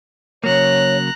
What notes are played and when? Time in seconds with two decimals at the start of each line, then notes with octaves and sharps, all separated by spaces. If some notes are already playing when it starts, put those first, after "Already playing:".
0.44 C#3 F#3 A#3 C#5 A#5 F#6